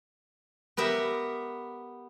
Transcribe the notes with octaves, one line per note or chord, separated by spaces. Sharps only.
B3 G4 A#4 E5